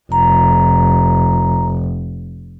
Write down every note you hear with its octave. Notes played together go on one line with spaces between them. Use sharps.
F1 A#5